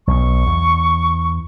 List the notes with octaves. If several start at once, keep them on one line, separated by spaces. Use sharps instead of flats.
B1 C#6
E2